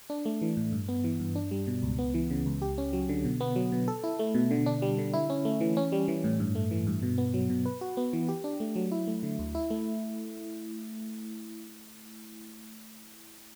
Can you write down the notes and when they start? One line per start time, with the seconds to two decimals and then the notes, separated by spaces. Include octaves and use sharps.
0.10 D4
0.25 A3
0.42 E3
0.57 A2
0.73 G2
0.88 B3
1.04 E3
1.20 G2
1.35 D4
1.51 G3
1.67 B2
1.83 C#2
1.98 B3
2.14 E3
2.30 C#3
2.46 C#2
2.62 G4
2.78 C#4
2.93 F#3
3.09 D3
3.24 B2
3.40 B3
3.56 F#3
3.72 B2
3.88 A4
4.04 E4
4.19 A3
4.35 B2
4.51 D3
4.66 D4
4.82 G3
4.98 D3
5.13 E4
5.30 C#4
5.45 A3
5.61 E3
5.77 C#4
5.92 G3
6.08 E3
6.24 A2
6.40 G2
6.55 A3
6.71 E3
6.87 G2
7.02 B2
7.18 B3
7.34 F#3
7.50 B2
7.66 B4
7.81 F#4
7.97 B3
8.13 E3
8.28 G4
8.44 D4
8.60 A3
8.76 F#3
8.91 E4
9.07 A3
9.23 D3
9.39 D2
9.55 E4
9.70 A3